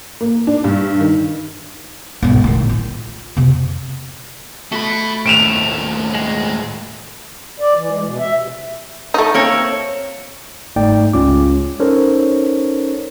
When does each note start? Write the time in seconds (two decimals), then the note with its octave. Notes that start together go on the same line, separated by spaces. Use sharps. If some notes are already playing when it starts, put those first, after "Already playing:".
0.21 A#3
0.47 D4
0.64 G2
1.00 D#3
2.22 B1 G#2
2.44 A2 D#3
2.69 F4
3.37 F2 C3
4.72 A3 F#4 B5
5.26 D#2 A2 D7 E7 F7
6.15 G#3
7.60 D5
7.75 E3
7.90 G#3
8.04 B2
8.19 E5
8.39 C3
9.14 A3 D#4
9.34 A#3 C4 C#5
10.76 G1 G#2 A3 D#4 D5 G5
11.13 C#2 G#3 C#4 F4 D6
11.80 C#4 D#4 A4 A#4 C5 C#5